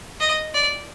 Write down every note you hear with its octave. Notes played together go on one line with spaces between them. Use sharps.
D#5
D5